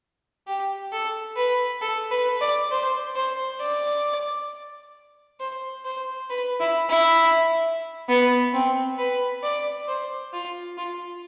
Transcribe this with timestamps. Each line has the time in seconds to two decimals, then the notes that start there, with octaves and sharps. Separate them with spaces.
0.47 G4
0.92 A4
1.37 B4
1.81 A4
2.11 B4
2.41 D5
2.71 C5
3.16 C5
3.61 D5
5.40 C5
5.85 C5
6.30 B4
6.60 E4
6.89 E4
8.09 B3
8.53 C4
8.98 B4
9.43 D5
9.88 C5
10.33 F4
10.78 F4